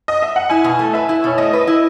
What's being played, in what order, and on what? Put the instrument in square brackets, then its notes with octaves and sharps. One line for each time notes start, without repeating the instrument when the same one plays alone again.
[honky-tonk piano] D#5
E5
F#5
[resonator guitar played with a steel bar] E4 [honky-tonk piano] G#5
[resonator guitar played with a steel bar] B2
A3
[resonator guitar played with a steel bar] B4 [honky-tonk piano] E5
[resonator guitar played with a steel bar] E4
[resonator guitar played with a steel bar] B2 [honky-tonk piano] C#5
[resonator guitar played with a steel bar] A3 [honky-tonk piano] D#5
[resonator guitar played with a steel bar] B4
E4